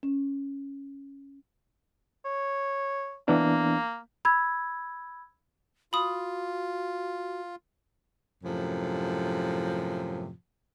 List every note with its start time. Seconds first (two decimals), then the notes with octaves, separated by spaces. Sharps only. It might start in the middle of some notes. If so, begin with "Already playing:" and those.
0.03 C#4
2.25 C#5
3.28 E3 A#3 B3 D4
4.25 B5 E6 G#6
5.93 F4 F#4 B5 D#6
8.44 F#2 A2 C3 F3